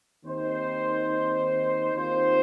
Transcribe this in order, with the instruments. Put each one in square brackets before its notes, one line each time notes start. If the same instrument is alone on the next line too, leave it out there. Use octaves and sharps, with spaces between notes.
[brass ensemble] D#2 D#3 C4 D#4 C5
D#2 D#3 C4 F4 C5